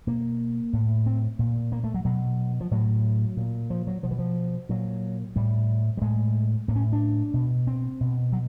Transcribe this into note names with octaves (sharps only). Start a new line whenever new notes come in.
B2 A#3
A2
C4
A#2
A#3
A3
F#3
B2 F#3
F3
A2 F#3
A#2
F3
F#3
B2 F3
E3
F3
A#2 F#3
A2 G3
G3
A2 G#3
A2 A#3
C#4
D4
B2
C4
B2
F#3